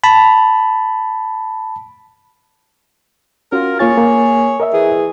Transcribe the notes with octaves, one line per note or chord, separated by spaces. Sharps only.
A5 B5
C#4 F4 F#4 A#4
A#3 F4 G#4 C#5 A6
A#3
A#4 D#5 E5
E3 G#4